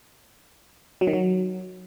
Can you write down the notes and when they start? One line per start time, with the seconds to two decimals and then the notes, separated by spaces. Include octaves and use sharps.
1.01 F#3
1.07 D#3
1.13 F#3